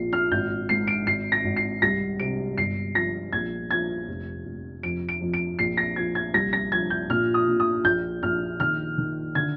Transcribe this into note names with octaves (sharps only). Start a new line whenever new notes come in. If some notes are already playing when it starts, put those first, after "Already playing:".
Already playing: A#1 A#2 C7
F6
G#1 G6
G#2 C7
D7
G#1 C7
A#6
G#1
C7
C2 A#6
C3 D7
G1 C7
F3 A#6
A#1 G#6
F3 G#6
F1
F1
F2 D7
D7
F2
D7
A#1 C7
A#6
F3 G#6
G#6
C2 A#6
A#6
F3 G#6
G6
A#2 F6
D#6
A#2
D#6
A#1 G6
A#1 F6
D#3 F6
D#3
D3 G#6